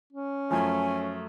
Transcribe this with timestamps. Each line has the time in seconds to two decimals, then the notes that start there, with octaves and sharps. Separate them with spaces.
0.13 C#4
0.51 F#2 F3 A3 G#5